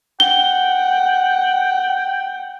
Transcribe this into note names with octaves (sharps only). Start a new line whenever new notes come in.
F#5 G5 G7